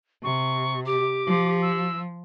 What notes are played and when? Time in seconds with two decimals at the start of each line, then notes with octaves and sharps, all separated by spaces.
0.24 C3 C#6
0.86 G4 D6
1.27 F3
1.62 E6